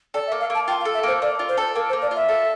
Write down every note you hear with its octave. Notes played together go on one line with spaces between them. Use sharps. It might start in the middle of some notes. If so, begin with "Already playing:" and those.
A4 D5
E5
A#3
F5
A#3 A5
F4 G5
F5
A4
E5
A#3 C5
A#3 D5
F4
C5
A4
A#3 A#4
C5
A#3
D5
F4 E5
A4